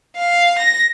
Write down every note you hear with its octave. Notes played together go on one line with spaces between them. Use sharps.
F5
A#6